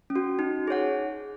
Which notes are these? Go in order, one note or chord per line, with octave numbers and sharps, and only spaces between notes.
C#4
F#4
D#4
G#4 C#5 F#5